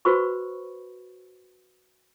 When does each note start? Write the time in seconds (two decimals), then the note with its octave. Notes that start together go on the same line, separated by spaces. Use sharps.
0.05 F#4 B4 C5 B5 C#6